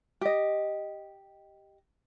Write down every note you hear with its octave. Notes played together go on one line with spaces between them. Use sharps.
G4 D#5